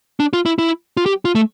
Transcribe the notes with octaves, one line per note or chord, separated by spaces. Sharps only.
D4
F4
E4
E4
F4
G4
F4
A3